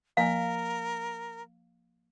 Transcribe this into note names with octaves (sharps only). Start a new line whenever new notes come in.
F3 A#3 A#4 F5 G#5